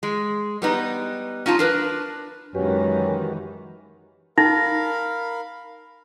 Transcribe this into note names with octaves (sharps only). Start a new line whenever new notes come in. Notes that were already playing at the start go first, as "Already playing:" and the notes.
G#3
G3 B3 D#4
C#4 D#4 F4 A5
D4 A#4 B4
F#2 D#3 E3 G#3 C#4 F#4 G4 B4
D#4 A#4 F5 B5 A#6